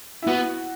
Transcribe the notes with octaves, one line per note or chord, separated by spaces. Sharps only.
E4
B3 F#4